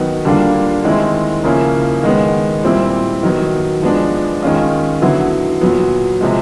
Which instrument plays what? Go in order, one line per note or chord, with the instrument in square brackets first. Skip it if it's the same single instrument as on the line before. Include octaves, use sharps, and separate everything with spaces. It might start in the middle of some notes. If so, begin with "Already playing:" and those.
Already playing: [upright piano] D#3 F#3 B3
D3 G3 A#3 D4 F4
D#3 G#3 C4 E4
C#3 F3 A#3 C#4 E4
D#3 G#3 B3
A#2 G3 C4 E4
D#3 F#3 B3
F3 G#3 B3 D4
D#3 G#3 C#4 F4
D3 F#3 B3 E4
A#2 F#3 B3
C3 F3 G#3